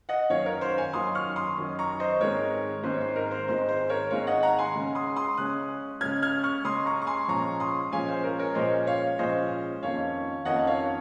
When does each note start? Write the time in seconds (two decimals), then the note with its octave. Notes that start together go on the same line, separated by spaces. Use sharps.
0.09 D#5 F#5
0.30 F#2 D#3 F#3 C#4 C#5 F5
0.45 A#4 C#5
0.61 C5
0.78 F5 G#5
0.93 F#2 D#3 F#3 C#4 C6 D#6
1.15 C#6 F6
1.36 C6 D#6
1.57 F#2 D#3 F#3 C#4
1.79 A#5 C#6
2.00 C5 D#5
2.20 G#2 D#3 G#3 C4 A#4 C#5
2.84 G#2 D#3 G#3 C4 C5
2.94 C#5
3.01 C5
3.16 A#4
3.31 C5
3.47 G#2 D#3 G#3 C4 C5
3.69 C5
3.89 A#4 C#5
4.10 G#2 D#3 G#3 C4 C#5 F5
4.27 D#5 F#5
4.43 F#5 A#5
4.58 G#5 C6
4.75 C#3 G#3 C#4
4.95 C6 D#6
5.16 C6 D#6
5.37 C#3 G#3 C#4 D#6 F#6
6.01 C#3 G#3 C#4 F6 G#6
6.22 F6 G#6
6.43 C#6 F6
6.64 C#3 G#3 C#4 C6 D#6
6.86 A#5 C#6
7.02 C#6
7.07 G#5 C6
7.28 A#2 F3 G#3 C#4 A#5 C#6
7.60 C6 D#6
7.92 A#2 F3 G#3 C#4 F5 G#5
8.08 C5
8.24 A#4
8.39 A#4 C#5
8.55 A#2 F3 G#3 C#4 C5 D#5
8.87 C#5 F5
9.19 A#2 F3 G#3 C#4 C5 D#5
9.82 F2 D#3 A#3 C#4 C#5 F5
10.45 F2 D#3 A#3 C#4 D#5 F#5
10.67 C#5 F5